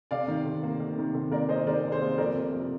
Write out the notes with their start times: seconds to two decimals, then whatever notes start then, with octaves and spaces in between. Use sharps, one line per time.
0.11 C3 D5 F5
0.28 D#3
0.45 C3
0.63 A#3
0.80 C3
0.98 D#3
1.15 C3
1.31 A#3 A#4 D5
1.49 C3 C5 D#5
1.66 D#3 A#4 D5
1.84 C3 D5
1.92 G#4 C5
2.02 A#3
2.18 F2 A#4 D5
2.36 C3
2.53 F2